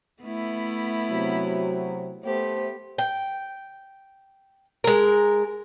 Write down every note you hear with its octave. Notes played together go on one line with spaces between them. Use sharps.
A3 B3 E4
C3 F#3
A3 B3 G4 C5
G5
G#3 A#4